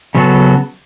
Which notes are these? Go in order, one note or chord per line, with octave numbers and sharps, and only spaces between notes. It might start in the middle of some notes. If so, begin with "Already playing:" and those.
C#3 F#3 B3 F#4 A4